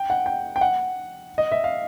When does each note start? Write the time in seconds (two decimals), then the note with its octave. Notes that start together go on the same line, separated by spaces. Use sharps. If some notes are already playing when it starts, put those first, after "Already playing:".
Already playing: G5
0.10 F#5
0.26 G5
0.56 G5
0.61 F#5
1.38 D#5
1.52 E5
1.64 F5